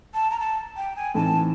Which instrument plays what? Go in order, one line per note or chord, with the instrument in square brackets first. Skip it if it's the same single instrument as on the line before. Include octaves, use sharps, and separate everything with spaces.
[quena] A5
A#5
A5
G5
G#5
[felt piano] A2 E3 A3 C4 D#4 [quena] A5